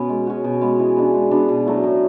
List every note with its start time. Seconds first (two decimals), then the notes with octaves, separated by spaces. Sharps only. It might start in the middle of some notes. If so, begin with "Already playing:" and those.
Already playing: B2 B3 C#4
0.09 G#3
0.27 C#4 F#4
0.44 B2
0.61 G#3 B3
0.79 E3
0.97 B3 D4 G#4
1.14 G#3
1.31 B3 D4 F#4
1.49 B2
1.66 F#3 A3 E4
1.84 A2